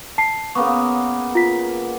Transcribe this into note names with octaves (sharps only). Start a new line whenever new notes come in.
A5 C7
C#3 A#3 B3 C#6
F4 B6